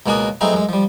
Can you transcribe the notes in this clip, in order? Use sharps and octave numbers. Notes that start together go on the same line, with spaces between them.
C#2 B2 A#3 C#4 F#4 D#6
F#3 A3 B3 C4 D#4 G#4
F#2 G#3
F3 G3